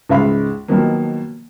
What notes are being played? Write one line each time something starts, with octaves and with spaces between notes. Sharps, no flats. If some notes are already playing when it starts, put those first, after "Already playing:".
C#2 G#2 G#3 E5 F5 B5
B2 D#3 F3 F#3 A#3